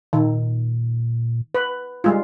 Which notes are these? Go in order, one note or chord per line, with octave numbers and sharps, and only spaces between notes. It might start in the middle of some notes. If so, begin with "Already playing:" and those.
A#2 D#3
B4
G3 G#3 F4